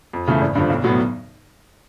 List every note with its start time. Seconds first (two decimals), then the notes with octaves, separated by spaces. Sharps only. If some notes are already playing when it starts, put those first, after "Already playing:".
0.13 F2
0.28 C#3 E3 A3
0.41 G#1
0.55 G2 D3 F3
0.70 B1
0.84 A2 F#3 B3